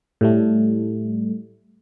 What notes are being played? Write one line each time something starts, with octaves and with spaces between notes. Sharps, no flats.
A2 G3 A3